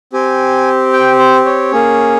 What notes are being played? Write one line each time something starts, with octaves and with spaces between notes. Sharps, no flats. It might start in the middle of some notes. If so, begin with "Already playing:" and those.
C4 G4 G#5
G5
C5
C#5
A#3 C#4 G#4